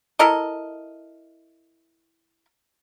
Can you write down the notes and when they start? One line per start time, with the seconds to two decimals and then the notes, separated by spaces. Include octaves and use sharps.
0.19 E4 A4 A#4 D#5